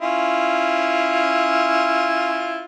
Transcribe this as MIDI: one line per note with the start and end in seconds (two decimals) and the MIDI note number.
0.01 2.65 61
0.01 2.65 64
0.01 2.65 65